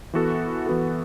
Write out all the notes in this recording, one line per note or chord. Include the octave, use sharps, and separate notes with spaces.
E3 B3 F#4 A4
E3 B3 F#4 A4